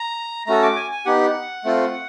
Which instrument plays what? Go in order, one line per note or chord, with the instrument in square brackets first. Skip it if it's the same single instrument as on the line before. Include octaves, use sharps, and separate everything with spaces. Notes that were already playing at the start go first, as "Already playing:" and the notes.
Already playing: [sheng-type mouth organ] A#5
A3 C#4 F#4 A4 A#5
D6
G#5
G#5
B3 D#4 G4 F#5
A3 C4 F4